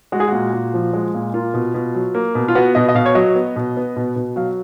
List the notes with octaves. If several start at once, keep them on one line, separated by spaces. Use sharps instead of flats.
G#3 F#4
G#4
A#2 F#4
A#2
F3
G#3
A#2
A#3 F4
B2
B2
F#3
A#3
B2
F4
B3 F#4
B2 D#5
D#5
B2 F5
C#5
F#3 D#5
B3
B2
B3
B2
B2
F#3 F5